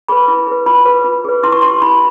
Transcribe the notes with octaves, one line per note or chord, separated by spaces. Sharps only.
G#4 B4 B5
E4
G#4 B4
F4 B5
G#4 B4
F4
G#4 B4
E4 C6
C#6
G4 B4 C6
E4 B5